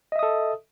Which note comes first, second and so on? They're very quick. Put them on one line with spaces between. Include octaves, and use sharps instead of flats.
D#5 E5 D#6 A4